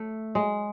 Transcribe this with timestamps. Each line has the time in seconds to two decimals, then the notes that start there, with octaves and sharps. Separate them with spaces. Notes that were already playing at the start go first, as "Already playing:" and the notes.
Already playing: A3
0.35 G#3